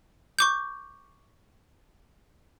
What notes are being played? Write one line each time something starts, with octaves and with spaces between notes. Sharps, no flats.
C#6 D6 G6